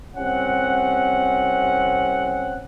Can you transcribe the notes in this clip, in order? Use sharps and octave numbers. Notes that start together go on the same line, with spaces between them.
C2 C4 C#4 F#5